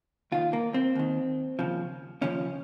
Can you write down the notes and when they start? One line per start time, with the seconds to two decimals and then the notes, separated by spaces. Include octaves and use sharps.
0.32 D#2 D#3 F4
0.53 A#3
0.74 C4
0.95 D#2 D#3
1.59 D#2 C#3 F3
2.21 D#2 C#3 F3 C#4